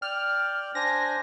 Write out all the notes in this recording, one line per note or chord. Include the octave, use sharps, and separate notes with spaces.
D5 G5 F6
D4 C5 G#5 A#6